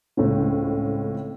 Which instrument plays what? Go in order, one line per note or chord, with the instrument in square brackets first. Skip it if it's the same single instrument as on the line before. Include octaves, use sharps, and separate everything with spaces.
[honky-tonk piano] C#2 A2 C4 C#4